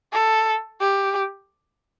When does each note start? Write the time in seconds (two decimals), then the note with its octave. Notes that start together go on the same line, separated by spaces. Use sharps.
0.13 A4
0.81 G4